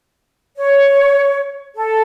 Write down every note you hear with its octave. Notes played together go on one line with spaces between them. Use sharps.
C#5
A4